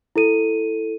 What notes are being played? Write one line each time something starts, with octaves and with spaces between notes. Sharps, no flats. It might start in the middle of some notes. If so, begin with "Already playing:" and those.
E4 A4 D#7